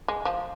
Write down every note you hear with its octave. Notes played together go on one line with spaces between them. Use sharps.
G#3
F3